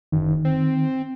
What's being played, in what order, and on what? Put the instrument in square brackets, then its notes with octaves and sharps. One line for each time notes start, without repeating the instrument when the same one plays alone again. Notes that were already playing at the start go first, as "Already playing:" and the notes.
[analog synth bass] F#1 [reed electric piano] D#3
[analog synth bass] C4